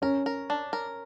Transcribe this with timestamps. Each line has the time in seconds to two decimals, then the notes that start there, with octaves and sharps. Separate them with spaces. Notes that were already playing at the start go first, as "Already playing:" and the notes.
0.02 C#4 A#4
0.26 A#4
0.50 D4
0.73 A#4